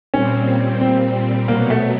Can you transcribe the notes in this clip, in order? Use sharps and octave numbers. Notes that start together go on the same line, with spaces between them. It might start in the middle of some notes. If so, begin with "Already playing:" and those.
A#2 G3 C4 C#4
C4
B2 F#3 A#3 B3
A3